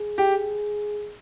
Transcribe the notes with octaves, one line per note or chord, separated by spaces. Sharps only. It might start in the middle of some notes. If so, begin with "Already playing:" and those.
Already playing: G#4
G4